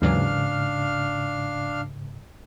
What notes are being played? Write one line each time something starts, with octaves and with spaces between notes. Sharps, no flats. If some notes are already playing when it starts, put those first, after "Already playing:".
D#2 G#2 C#3 E3 F#3 D4 F5 F6